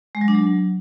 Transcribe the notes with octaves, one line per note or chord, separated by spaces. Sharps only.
G#3
F#3
D4
F#3